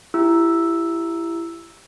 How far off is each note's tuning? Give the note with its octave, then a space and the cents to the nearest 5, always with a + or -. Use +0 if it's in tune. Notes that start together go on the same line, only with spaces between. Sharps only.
E4 +25 G4 +0 E6 +0